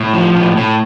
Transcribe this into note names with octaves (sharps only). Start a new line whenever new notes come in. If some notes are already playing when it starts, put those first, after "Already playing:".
Already playing: A2
F3
A2
A2